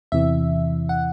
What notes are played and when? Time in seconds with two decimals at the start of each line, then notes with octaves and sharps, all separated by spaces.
0.12 E2 C3 E3 E5
0.89 F#5